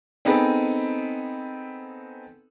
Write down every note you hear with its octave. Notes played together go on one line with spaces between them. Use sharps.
B3 C4 D#4 G#4 A4 B4